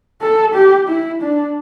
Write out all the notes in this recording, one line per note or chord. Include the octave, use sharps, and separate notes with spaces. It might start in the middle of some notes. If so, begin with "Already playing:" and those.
A4
G4
E4
D4